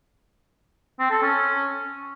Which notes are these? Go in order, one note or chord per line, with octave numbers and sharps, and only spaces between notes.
C4
A4
C#4